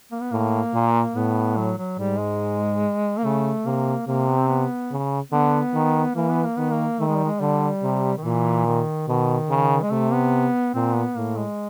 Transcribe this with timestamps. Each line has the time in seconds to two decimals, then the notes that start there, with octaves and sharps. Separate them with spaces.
0.12 A#3
0.21 B3
0.31 A2 A#3
0.74 A#2
1.16 A2 B3
1.57 F#3
1.78 F#3
1.99 G#2 G3
2.19 G#3
3.18 A#3
3.24 C#3 A3
3.66 C3 A#3
4.07 C3 A#3
4.29 B3
4.39 C4
4.49 B3
4.91 C#3
5.32 D3 B3
5.74 D#3
6.15 E3 A#3
6.30 B3
6.44 A#3
6.57 D#3 B3
6.71 A#3
7.00 D#3 A3
7.08 G#3
7.17 G3
7.25 G#3
7.40 D3 G3
7.83 C3
8.18 D#3
8.24 A#2 E3
8.66 D#3
9.08 B2 D#3
9.50 C#3
9.83 G#3
9.91 C3 A3
10.13 B3
10.74 A#2 C4
10.95 B3
11.16 A2 A#3
11.37 G#3